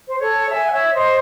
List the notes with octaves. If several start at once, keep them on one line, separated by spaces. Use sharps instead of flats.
C5
A4 C#5
E5 G#5
F#5
C#5 E5
C5 D#5